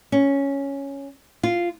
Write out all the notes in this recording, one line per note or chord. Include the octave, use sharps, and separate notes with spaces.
C#4
F4